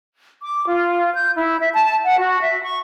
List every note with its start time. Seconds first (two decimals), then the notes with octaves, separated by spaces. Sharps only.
0.42 D6
0.67 F4
1.14 G6
1.36 E4
1.60 E5
1.73 A5
2.04 F#5
2.18 F#4
2.41 E5
2.62 C#6